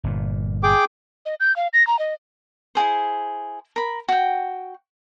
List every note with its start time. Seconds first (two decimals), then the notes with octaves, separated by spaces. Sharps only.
0.04 G1 A#2
0.63 G#4 G5 D6
1.26 D#5
1.40 G6
1.56 F5
1.73 A#6
1.87 A#5
1.99 D#5
2.75 E4 F#4 G#4 C5
3.76 A#4 B5
4.08 F#4 G5